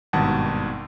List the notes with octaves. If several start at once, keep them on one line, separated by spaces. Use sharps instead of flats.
G#1 G2 B2 D#3 F#5 A5